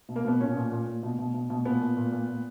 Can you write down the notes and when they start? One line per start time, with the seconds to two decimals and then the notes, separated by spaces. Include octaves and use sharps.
0.09 B2
0.16 A#3
0.25 B2 B3
0.40 A#2 C#4
0.56 A#2
0.72 A#2
0.87 A#2
1.03 B2
1.19 B2
1.34 B2
1.50 B2
1.65 A#2 B3
1.81 A#2
1.97 A#2
2.12 A#2
2.28 A#2